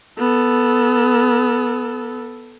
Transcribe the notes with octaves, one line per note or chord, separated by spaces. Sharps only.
B3 A4